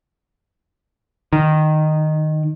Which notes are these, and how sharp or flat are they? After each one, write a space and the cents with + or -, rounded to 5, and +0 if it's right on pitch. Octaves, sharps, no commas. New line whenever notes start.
D#3 -10